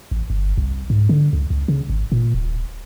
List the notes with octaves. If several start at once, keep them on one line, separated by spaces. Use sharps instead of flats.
A1
G1
C2
G#2
D3
C#2
C#2
C#3
G#1
A#2
D1